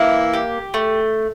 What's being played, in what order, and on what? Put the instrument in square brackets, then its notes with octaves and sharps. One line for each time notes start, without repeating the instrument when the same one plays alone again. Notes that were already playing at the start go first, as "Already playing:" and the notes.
Already playing: [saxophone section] E3 E4 [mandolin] A#3
[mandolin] G4
A3